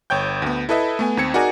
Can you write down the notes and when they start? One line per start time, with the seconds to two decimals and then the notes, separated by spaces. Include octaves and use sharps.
0.10 G1 C#5 G5 G6
0.42 D2 B3
0.69 E4 A4 B4 D#5 E5
0.99 A3 B3 G#5
1.17 D#2 C4 G#6 C#7
1.34 D#4 F#4 G#4 A#4 D5 G#5